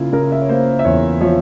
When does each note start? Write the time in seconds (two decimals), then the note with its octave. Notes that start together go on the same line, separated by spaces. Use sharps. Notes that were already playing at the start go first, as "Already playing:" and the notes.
Already playing: C#3 A#3 E4 F4
0.12 C#3 A#4
0.32 E5
0.41 C#5
0.49 A#3 C5
0.79 E5
0.85 E2 C#5
1.21 F3 C#5